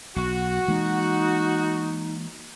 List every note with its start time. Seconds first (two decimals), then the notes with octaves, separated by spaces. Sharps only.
0.16 B1 F#4
0.68 E3 G#3 A#3 D#4